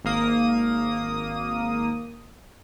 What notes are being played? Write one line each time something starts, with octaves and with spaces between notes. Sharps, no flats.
G#1 A#3 D#6